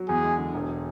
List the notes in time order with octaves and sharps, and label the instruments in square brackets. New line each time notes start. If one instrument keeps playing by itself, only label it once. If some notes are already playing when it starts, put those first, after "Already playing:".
Already playing: [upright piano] F#3
[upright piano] E2 [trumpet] G#4
[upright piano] G#3
D3
E1